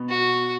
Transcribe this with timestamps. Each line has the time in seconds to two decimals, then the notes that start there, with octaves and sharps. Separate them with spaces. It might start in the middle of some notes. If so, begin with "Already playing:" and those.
Already playing: B2 B3
0.09 F#4